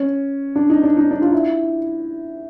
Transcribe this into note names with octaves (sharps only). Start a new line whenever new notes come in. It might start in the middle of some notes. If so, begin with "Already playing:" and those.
Already playing: C#4
D4
D#4
D4
D#4
D4
F4
E4